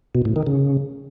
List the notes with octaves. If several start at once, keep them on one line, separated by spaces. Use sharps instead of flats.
B2
A2
D#3
C#3